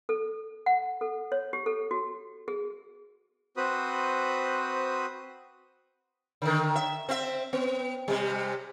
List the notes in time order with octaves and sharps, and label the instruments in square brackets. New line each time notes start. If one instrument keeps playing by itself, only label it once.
[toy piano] A4
F#5
A4
C#5
G4
A4
F#4
G#4
[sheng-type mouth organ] C4 F#4 B4 C5 B5 D#6
[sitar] D3 D#3
E5
C4 E5
B3
C3 G3